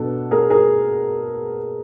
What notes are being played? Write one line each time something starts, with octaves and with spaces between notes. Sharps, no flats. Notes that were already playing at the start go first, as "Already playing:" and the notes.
Already playing: B2 F#3 B3 D4 A4
G#4 A#4
G#4 A#4